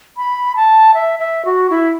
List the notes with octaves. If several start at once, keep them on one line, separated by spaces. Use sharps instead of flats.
B5
A5
E5
E5
F#4
E4